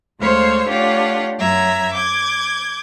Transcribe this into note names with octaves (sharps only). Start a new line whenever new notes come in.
D2 G#3 C5 C#5 F5 E6
A3 D4 F4 G4 C#5 F#5
F#2 F#3 E5 A#5 G#6
D6 G6 G#6